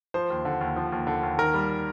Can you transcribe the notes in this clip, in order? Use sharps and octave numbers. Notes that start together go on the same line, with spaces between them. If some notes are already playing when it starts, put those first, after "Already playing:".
F3 C5
D#2
D3
D#2
F3
D#2
D3
D#2
D#3 A#4
G3